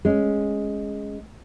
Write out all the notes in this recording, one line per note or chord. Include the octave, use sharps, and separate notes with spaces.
G#3 C#4